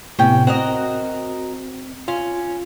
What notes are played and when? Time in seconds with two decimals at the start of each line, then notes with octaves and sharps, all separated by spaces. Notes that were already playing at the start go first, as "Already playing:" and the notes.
0.19 A2 C3 B3 C#4 G5
0.47 C4 F#4 A#4 D#5
2.08 C#4 F4